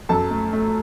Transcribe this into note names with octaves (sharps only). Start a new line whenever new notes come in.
F#2 A4 A5
A3
A3